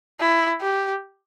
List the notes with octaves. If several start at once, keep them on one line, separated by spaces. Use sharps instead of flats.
E4
G4